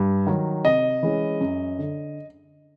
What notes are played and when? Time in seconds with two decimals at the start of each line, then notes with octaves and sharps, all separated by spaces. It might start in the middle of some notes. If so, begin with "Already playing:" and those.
Already playing: G2
0.27 D#3 F#3
0.64 C3 D#5
1.03 E3 G#3 C#4
1.41 F#2
1.78 D3